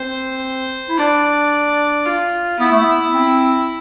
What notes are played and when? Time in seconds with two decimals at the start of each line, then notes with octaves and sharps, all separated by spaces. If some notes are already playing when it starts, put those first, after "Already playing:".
Already playing: C4 C5
0.89 E4
0.97 D4 D5
2.06 F4
2.59 B3 E4
2.72 A3
2.82 B3
3.14 C4